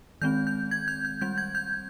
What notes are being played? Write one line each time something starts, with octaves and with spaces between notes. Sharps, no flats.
D#3 G#3 C4 G6
G6
G#6
G6
G6
G3 C4 G6
G#6
G6